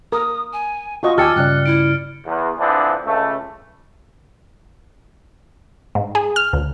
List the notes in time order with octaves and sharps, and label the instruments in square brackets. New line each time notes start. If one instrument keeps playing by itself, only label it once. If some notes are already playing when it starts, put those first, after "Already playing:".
[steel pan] A#4 [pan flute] D#6
[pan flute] G#5
[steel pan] F4 F#4 D#5 [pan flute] C#6
[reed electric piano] D#2 A5 [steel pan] G4 G#5 [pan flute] E6 [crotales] F6 A6 C#7
[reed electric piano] G2 C#3 D5 [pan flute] F#6
[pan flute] E4 [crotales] D7
[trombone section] E2
D3 E3 F3 C4 D4
C#2 A3
[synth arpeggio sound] G#2
G#4
F6
D2